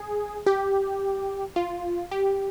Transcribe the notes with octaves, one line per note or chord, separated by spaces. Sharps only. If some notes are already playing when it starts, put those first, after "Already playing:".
Already playing: G#4
G4
F4
G4